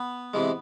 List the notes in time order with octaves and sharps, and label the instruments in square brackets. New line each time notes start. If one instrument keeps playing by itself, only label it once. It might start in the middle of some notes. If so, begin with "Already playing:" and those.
Already playing: [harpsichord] B3
C3 E3 G#3